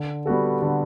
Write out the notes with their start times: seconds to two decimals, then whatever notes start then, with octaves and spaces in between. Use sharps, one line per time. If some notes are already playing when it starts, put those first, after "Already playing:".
Already playing: D3
0.26 G3 B3 F#4 A4
0.62 D3